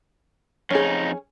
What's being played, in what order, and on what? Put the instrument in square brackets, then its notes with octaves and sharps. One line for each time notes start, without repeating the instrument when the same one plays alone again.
[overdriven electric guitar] F2 D#4 [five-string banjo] C#4 G#4